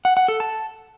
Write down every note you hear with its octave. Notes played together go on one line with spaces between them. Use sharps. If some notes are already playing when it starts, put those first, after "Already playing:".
F#5
F#5
A4
A5